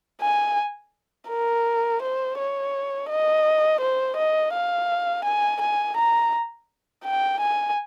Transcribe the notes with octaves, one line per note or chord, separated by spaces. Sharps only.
G#5
A#4
C5
C#5
D#5
C5
D#5
F5
G#5
G#5
A#5
G5
G#5